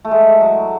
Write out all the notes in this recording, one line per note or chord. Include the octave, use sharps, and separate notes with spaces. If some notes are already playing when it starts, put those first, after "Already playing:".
A3
G#3
F#3